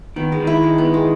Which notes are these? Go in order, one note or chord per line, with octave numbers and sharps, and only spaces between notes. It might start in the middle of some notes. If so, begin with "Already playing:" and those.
D#3 B3
G#3
D#3
E4
G#3
B3
G#3